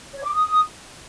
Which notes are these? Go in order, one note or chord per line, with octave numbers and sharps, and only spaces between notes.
C#5
D6
D#6